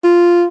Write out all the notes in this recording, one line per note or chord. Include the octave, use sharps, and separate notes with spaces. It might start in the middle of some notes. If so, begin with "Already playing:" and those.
F4